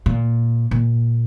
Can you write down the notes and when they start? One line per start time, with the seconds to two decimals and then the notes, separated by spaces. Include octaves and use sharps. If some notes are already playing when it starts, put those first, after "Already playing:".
0.06 A#2
0.71 A#2